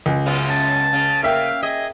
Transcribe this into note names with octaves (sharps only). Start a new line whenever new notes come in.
C#2
F#2 C#3 B3
A5
C#3
A#3 E5 F5 G5
G#4 D#5